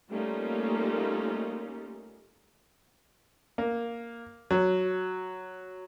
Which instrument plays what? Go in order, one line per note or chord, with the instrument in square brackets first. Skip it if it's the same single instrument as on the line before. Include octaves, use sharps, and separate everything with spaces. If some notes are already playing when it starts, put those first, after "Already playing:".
[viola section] G3 A3 A#3 C#4 D#4 F4
[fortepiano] A#3
F#3